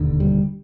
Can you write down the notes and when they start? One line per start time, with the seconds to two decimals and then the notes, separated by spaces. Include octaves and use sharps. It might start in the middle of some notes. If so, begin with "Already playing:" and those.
Already playing: E1 D#2 D3
0.20 G3